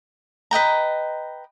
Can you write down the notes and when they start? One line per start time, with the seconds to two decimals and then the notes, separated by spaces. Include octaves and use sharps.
0.51 B4 D#5 G5 A#5